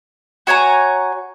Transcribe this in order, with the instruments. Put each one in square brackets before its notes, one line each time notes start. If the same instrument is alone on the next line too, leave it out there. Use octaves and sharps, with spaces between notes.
[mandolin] F#4 C#5 G#5 A#5